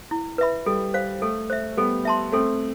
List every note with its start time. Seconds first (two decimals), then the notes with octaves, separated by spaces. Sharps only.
0.11 E4
0.38 B4 E5 B5
0.66 G3 A4
0.94 C5 F5
1.22 A3 A4
1.50 C5 E5
1.77 G3 B3 A4
2.05 E5 A5 C6
2.32 A3 C4 A4